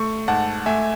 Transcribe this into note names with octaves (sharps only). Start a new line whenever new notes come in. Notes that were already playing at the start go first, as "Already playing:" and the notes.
Already playing: A3 C#6
G#2 F#5 A5
A3 E5 G#5